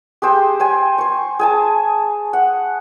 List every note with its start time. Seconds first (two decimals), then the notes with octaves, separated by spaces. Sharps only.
0.22 G4 G#4 C5 G5
0.60 C5 G5 G#5
0.98 C5 C#6
1.39 G#4 G#5 A5
2.33 F#5